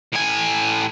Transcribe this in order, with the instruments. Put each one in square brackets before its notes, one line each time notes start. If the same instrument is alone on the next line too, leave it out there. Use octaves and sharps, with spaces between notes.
[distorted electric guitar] A2 G#5